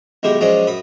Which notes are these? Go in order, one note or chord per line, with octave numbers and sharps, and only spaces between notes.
B1 D#3 G#3 E4 G4
F3 F#3 G#3 C#4 D5 D#5
F#2 B5 D#6